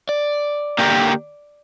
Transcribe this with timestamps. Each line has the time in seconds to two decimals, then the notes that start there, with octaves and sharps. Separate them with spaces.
0.09 D5
0.79 D3 A#3 G4 A#4